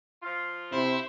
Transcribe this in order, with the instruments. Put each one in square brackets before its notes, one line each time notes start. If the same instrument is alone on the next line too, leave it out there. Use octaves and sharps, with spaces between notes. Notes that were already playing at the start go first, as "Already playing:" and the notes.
[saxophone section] F3 F4
[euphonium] C3 [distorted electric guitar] E4 [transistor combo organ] C5